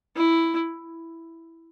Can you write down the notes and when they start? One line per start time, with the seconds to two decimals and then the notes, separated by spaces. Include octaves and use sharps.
0.16 E4